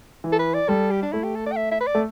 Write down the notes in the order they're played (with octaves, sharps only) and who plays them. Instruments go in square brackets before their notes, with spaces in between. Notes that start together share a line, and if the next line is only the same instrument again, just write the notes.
[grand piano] E3
[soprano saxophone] A4
B4
D5
[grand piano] G3 [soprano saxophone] A4
[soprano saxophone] G4
D4
[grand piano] A3 [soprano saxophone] E4
[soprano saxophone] G4
A4
D5
G5
E5
E5
B4
D5
[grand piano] A3